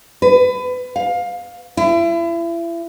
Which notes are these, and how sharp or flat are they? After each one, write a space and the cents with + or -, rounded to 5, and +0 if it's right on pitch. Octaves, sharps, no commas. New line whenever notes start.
B4 +25
F5 +20
E4 +35